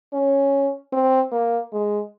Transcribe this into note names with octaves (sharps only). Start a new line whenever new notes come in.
C#4
C4
A#3
G#3